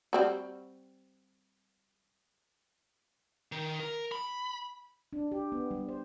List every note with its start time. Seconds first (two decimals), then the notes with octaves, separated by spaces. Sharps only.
0.13 G3 C4 F#4
3.52 D#3
3.80 A#4
4.12 B5
5.13 D4
5.32 G4
5.52 B3
5.71 G3
5.89 C5